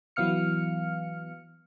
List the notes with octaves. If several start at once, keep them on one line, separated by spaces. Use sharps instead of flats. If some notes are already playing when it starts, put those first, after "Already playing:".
E3 F#3 B3 F5 F6 C#7